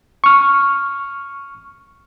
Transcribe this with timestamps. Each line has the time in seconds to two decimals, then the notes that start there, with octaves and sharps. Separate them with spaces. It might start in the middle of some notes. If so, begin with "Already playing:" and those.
0.24 C#6 F6